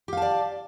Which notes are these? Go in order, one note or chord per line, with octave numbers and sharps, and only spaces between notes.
G4 D5 F5 A5